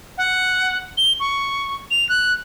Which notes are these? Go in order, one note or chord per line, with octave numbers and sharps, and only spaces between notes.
F#5
G7
C#6
F7
F#6